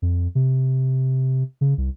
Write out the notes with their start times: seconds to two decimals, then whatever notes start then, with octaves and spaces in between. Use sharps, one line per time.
0.02 F2
0.35 C3
1.61 C#3
1.78 C2